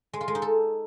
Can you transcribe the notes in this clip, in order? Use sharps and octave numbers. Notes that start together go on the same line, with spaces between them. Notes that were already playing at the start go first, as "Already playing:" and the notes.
G#3
F4
G#3
D#4
A4